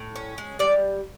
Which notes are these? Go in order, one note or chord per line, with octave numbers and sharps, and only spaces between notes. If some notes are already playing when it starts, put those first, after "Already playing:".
Already playing: A2
C#4
G#3
G3 D5